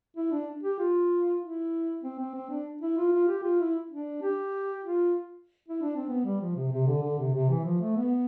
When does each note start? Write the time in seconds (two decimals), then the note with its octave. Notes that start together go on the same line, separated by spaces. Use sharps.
0.17 E4
0.32 D4
0.63 G4
0.79 F4
1.42 E4
2.04 C4
2.19 C4
2.35 C4
2.50 D4
2.82 E4
2.97 F4
3.13 F4
3.28 G4
3.43 F4
3.60 E4
3.91 D4
4.22 G4
4.84 F4
5.68 E4
5.82 D4
5.96 C4
6.09 B3
6.25 G3
6.41 F3
6.56 C3
6.72 C3
6.87 D3
7.02 D3
7.18 C3
7.34 C3
7.49 E3
7.65 F3
7.81 A3
7.96 B3